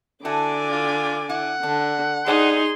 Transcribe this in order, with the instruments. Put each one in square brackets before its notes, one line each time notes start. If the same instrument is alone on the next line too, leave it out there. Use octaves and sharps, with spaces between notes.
[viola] D3 D6 [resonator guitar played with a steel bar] E4 F#4 A4 [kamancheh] D5 G#5
[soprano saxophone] F4
[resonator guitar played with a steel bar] E4 [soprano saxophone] F#5
[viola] D3 [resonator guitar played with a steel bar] D4
[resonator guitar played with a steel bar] G3 D5 G#5 [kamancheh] D#4 [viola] G#4 C6